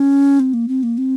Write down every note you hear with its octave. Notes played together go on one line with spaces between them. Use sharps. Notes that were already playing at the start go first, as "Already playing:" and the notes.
Already playing: C#4
C4
A#3
C4
A#3
C4